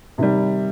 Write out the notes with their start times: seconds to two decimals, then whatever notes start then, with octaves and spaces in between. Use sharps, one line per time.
0.18 C3 D#3 G3